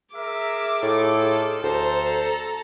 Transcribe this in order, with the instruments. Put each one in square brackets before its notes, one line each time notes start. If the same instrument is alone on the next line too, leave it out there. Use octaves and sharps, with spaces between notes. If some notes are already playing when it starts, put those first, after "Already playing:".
[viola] G#4 D6 [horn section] A#4 E5
[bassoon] A2 [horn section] D#4 F4 A4
[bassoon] D2 [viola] A4 A#5 [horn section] C5